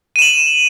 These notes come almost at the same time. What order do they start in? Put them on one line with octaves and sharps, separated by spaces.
D#7 E7 F#7